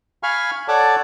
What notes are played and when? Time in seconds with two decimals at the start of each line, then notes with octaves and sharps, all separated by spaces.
0.23 F5 G#5 B5 C#6 F6
0.68 A4 C#5 D5 F#5 A5 D6